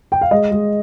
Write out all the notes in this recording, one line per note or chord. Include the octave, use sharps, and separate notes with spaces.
G5
F5
G#3 D#5
G#3